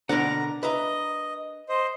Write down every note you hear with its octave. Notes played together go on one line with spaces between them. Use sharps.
B2 D3 D4 A#4 F#5 A#5
B4 D#5 E5 A#5
C5 D#5